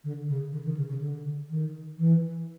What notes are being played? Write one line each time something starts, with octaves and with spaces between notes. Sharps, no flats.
D3
C#3
D3
D#3
C#3
C#3
D3
D#3
E3